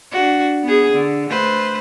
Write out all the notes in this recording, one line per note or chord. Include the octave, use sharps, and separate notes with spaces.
D4 F#4
B3 G#4
D3
A3 B4 C5